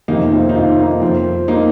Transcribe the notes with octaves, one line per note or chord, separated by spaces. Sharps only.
F2 C3 D#3 A#3 D#4
C4 F4
D#4
C4 F4
A#3 D#4
F2 F3 C4 F4
A#3 D#4